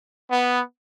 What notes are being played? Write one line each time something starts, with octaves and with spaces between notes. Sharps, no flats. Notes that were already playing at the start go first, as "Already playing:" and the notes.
B3